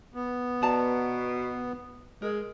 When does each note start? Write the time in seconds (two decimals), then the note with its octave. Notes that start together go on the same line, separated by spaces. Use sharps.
0.14 B3
0.62 B2 D5 A5 A#5
2.22 G#3 A#4